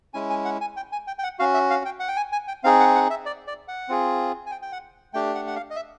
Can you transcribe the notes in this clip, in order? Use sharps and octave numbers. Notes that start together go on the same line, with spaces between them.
G#3 C#4 E4 G#5
G#5
F#5
G#5
G5
G#5
G5
G5
F#5
C#4 F#4 F5
E5
F5
G5
F#5
G5
G#5
G#5
G5
C4 D#4 G#4 F5
F#5
F#5
E5
D5
D5
F#5
C4 F4 G#4
G#5
G5
G5
F#5
A3 D4 G4 G5
F#5
F#5
F5
D#5
E5